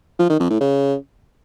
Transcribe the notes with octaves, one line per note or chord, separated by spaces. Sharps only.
F3
D#3
F2
A2
C#3